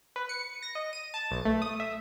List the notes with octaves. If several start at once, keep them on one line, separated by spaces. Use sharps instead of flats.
B4
C#7
A#6
D#5
D#7
A5
B1
A3
D#6
E5